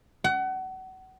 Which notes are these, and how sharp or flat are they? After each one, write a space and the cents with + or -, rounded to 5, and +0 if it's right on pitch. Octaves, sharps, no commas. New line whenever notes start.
F#5 +30